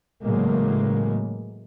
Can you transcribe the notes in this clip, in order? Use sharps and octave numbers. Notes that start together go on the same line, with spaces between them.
A2 C#3 E3 F#3 G#3 A#3